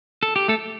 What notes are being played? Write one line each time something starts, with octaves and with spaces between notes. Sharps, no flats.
A4
G4
A3 A4